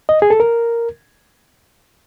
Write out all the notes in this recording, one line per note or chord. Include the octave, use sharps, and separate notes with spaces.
D#5
G#4
A4
A#4